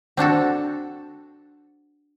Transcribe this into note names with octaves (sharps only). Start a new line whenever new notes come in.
C4 D4 F#4 A4